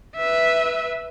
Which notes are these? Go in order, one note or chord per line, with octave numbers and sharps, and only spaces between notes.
B4 E5